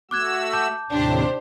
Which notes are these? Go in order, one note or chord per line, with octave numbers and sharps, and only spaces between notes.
A3 F#4 D6 E6 F#6 G#6
A5 D6 G6
D#2 A2 C3 D4 G4 C5